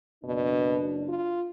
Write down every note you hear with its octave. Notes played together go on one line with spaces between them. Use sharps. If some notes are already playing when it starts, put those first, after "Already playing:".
F#1 B2 D4
F4